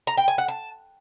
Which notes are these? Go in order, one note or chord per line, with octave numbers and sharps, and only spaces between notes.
A#5
G5
G#5
F#5
A5